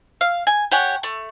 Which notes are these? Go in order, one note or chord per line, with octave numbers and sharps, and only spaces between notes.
F5
G#5
G4 C#5 F#5 G#5
A3